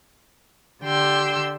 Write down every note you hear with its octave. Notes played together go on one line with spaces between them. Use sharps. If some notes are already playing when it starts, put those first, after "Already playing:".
D3 G4 G5 C6 E6